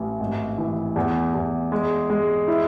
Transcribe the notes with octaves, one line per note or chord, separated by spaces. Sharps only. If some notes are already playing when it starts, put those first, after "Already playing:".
Already playing: A1
G#1
E3
E2
E2
G#3
G#3
E4